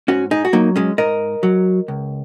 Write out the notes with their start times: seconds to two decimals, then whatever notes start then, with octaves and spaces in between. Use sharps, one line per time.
0.08 G#2 C#4 F#4
0.31 D#4 G#4
0.45 F#4
0.53 F#3 A#3 D#4
0.76 G#3 C#4
0.98 G#2 A#4 D#5
1.43 F#3
1.88 C#2